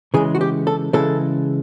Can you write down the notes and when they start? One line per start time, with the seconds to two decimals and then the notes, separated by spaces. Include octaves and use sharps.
0.14 C#3 E3 G#3 G#4
0.35 F#4
0.41 G4
0.67 A4
0.93 C#3 E3 G#3 A4